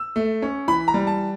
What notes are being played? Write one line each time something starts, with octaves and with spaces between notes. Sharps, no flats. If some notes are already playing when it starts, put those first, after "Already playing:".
Already playing: E6
A3
C#4
E3 B5
A#5
G3
A5